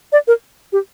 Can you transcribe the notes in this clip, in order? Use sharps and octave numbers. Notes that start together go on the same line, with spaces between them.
D5
A#4
G4